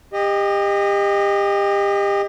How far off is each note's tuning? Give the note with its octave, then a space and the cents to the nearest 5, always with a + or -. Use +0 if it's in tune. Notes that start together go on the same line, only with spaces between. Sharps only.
G4 +30 D#5 -10